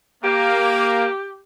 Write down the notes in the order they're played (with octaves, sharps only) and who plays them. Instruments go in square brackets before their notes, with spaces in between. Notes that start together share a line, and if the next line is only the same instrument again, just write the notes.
[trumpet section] A#3 [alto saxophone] G4